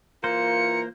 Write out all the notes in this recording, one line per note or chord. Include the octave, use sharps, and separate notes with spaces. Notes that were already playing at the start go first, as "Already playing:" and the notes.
E3 A#3 F4 A#4 C5 C#7